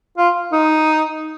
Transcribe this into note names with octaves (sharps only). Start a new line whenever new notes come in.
F4
D#4